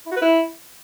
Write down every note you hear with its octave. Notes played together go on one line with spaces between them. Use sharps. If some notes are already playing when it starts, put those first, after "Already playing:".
E4
F#4
B4
E4